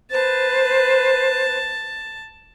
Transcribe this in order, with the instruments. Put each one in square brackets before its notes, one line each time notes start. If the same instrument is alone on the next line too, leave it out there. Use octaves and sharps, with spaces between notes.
[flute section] B4 C5 [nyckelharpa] A5